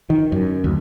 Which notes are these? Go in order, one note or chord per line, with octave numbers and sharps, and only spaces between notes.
D#3
F#2
D2